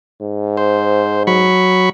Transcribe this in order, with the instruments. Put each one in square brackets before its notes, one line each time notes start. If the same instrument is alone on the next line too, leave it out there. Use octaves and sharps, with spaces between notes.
[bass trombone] G#2
[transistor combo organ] C5
F#3 B5 C#6